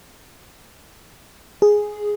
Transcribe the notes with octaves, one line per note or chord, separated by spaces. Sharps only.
G#4